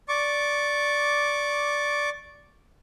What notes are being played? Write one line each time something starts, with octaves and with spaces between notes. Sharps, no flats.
D5 C#6 D6